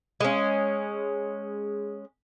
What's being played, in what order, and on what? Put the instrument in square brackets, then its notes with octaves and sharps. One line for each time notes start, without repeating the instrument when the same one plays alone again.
[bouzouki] G#3 C#4